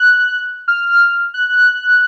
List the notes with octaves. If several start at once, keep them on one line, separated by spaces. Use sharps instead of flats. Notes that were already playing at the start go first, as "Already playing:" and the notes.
Already playing: F#6
F6
F#6
F#6